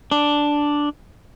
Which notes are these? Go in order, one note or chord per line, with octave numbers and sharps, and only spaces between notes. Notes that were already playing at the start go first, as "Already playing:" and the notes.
D4